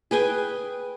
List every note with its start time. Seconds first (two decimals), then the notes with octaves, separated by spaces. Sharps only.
0.11 G#4 B4 G5 G#5